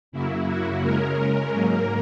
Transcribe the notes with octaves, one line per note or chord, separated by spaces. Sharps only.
F#2 C#3 F#3 A#3 E4
F#4
C#3 G#3 C#4 A#4
G#2 F#3 A#3 A#4